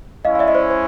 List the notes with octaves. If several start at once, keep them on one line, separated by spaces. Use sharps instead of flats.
G#3 C#4 E4 D#5 F5
F5
D5 E5
D#5
C5 D5
C5